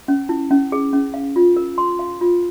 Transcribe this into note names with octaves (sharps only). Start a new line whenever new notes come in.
C#4
E4
C#4
G#4
C#4
F5
F4
A#4
C6
F5
F4